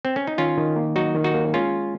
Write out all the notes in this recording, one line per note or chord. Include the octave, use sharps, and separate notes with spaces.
C4
C#4
D#4
D#3 C#4 F4
D#3
A#3
F#3 D#4 F#4
D#3
D#4 F#4
A#3
G#3 C#4 F4